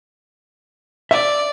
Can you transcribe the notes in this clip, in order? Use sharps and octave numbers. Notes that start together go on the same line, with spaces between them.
D5 E5